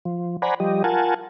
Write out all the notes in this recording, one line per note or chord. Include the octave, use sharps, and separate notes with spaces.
F3
C5 D5 F#5 G#5 A#5 B5
F3 G3 G4 D#5
F4 A#4 F#5 G#5 A5